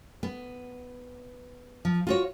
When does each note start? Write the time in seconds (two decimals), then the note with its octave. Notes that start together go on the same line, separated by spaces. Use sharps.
0.23 B3
1.85 F3
2.07 F4 F#4 C#5